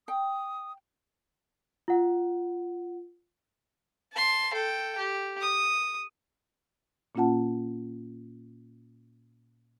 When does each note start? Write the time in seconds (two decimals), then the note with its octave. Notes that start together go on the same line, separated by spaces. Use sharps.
0.08 G5 D#6
1.88 F4 F#5
4.13 A5 C6
4.54 A4 G5
4.98 G4
5.42 D#6
7.15 A#2 A#3 C#4 F4 F#5 A5